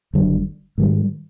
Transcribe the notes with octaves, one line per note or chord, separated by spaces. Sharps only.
F#1 F#2 D3 G3
G#2 D#3 G3